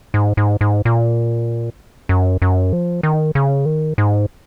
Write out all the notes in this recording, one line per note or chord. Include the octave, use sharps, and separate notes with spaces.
G#2
G#2
G#2
A#2
F#2
F#2
F3
D#3
C#3
D#3
G#2